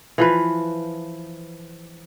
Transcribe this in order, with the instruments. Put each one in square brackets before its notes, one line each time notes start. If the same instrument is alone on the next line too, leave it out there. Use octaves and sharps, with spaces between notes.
[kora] E3 F3 B4